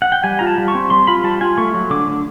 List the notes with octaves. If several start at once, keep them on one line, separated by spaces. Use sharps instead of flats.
F#5
G5
G3 G#5
F4 A#5
A5
G3
C#6
C4
G3 C6
F4 B5
G3 A5
F4 G#5
A3 C#6
F#3
D3 D6
D3